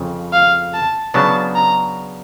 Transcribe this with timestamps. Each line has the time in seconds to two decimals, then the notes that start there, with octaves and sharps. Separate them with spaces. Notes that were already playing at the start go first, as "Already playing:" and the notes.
Already playing: F2 C#3
0.33 F5
0.74 A5
1.14 C#3 F#3 B3 D4 A5
1.55 A#5